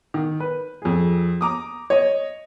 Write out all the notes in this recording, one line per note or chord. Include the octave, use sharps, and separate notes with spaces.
D#3
B4
F2 G#4
A#5 D6 D#6
C#5 D#5